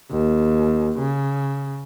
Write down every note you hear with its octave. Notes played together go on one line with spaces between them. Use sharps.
D#2
C#3